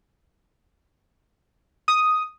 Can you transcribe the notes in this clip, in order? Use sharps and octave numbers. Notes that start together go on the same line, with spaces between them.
D#6